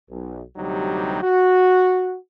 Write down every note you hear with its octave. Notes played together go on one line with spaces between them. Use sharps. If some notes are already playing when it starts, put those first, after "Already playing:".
B1
D2 C3 F#3 G3 D#4 G4
F#4